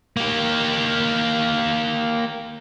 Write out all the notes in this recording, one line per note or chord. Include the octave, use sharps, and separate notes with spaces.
A#3 G4